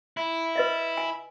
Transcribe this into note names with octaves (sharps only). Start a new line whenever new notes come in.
E4
B4 D#5 E5
G#5